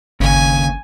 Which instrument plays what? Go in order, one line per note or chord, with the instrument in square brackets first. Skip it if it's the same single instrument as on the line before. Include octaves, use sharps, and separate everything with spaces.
[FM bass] G1 [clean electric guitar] D#2 C#3 [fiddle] G#5